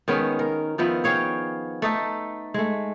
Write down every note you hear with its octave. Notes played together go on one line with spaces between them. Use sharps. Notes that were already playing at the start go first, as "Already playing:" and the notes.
D#3 G#3 B3 C#4
A#4
D#3 F3 B3 E4
G#4 C#5 F5 G5
A3 D#4 A4
G#3 A3